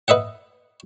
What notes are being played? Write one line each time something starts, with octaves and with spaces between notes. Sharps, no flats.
B4 D#5 E5 F#5